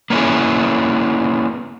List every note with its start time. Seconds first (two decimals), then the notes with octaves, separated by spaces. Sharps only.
0.10 A#3 B3 C#4 E4 G#4